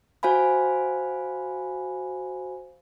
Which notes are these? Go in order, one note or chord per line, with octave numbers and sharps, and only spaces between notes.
F#4 C5 F5 G#5 B5